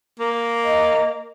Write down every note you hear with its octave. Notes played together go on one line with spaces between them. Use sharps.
A#3
D#5